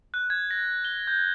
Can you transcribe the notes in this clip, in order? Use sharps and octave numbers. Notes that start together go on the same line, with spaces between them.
F#6
G#6
A#6
G7
G6